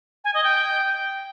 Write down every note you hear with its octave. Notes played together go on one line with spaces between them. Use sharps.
G#5
D#5
G5